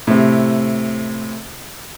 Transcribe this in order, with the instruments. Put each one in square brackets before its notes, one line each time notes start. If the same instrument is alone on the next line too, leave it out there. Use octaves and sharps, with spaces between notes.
[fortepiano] A2 C3